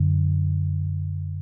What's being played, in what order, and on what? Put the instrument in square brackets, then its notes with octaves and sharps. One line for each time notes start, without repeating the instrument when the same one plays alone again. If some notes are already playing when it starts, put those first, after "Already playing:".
Already playing: [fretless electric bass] F#2 D3